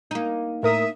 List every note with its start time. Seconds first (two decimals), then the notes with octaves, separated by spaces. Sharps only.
0.11 A#3 D#4
0.63 A2 A#4 E5 D#6